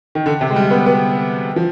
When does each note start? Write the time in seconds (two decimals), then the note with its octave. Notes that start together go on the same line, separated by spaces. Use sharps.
0.15 D#3
0.26 D3
0.41 C3
0.50 G#3
0.56 G3
0.71 B3
0.86 B3
1.56 F3